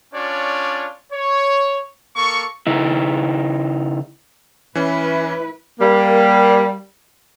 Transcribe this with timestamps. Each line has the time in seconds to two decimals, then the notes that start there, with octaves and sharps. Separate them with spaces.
0.14 C#4 D4 F4 C#5 D5
1.12 C#5
2.16 A#3 A4 C#6
2.67 C#3 D#4 E4
4.75 E3 C#4 E4 B4
5.79 G3 A#3